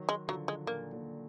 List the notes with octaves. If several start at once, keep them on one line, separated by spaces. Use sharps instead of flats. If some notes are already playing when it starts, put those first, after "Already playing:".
Already playing: D#3 F#3
G#3
D3 F3 F#3
G#3
A#2 D3 A#3
A#2 D3